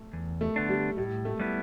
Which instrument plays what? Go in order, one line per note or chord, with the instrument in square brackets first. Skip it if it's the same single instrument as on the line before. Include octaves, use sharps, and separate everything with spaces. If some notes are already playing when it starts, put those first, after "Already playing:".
Already playing: [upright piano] A3
[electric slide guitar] E2
[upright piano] A3
[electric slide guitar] D3 B3 D4
[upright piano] G3
[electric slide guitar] A2 [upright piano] G3
[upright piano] A3
[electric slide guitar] G3 B3 E4